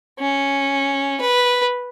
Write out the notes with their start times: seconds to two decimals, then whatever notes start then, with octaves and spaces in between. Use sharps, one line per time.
0.19 C#4
1.21 B4